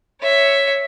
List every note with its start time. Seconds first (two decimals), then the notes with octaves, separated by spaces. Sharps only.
0.22 C#5 E5